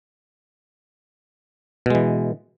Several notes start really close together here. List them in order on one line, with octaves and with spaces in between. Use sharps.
B2 G#3 E3